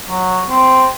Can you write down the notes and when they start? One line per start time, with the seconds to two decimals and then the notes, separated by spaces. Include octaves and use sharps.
0.10 F#3
0.49 C4